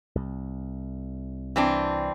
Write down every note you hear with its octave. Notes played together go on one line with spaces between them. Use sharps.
C2
E3 C4 D4